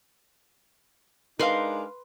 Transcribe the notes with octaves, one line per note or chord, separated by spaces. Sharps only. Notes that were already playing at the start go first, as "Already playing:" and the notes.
G#3 D4 D#4 A#4 B4 F5 C6